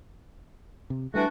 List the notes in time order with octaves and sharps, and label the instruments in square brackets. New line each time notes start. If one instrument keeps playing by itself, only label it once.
[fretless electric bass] C3
[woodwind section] E3 D4 F#4 [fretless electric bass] G3 A3